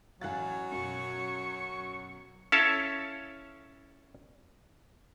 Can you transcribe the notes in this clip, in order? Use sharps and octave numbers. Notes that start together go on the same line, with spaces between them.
A1 F#3 F5 G#5 F#6 A6
F#2 B2 C#6
C#4 E4 A4 C#5 F5 A5